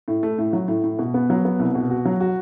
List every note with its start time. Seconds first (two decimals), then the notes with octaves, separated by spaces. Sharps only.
0.08 A2
0.23 A3
0.38 A2
0.53 F#3
0.68 A2
0.84 A2
0.99 B2
1.14 B3
1.30 F#3
1.45 B3
1.59 C2
1.75 B2
1.90 F#4
2.05 F#3
2.20 F#4